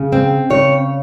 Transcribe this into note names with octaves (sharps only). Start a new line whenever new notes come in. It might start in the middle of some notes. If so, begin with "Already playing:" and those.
Already playing: C#3
C4
C#3 C#5